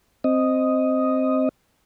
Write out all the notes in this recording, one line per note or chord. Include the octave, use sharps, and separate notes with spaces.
C4 D#5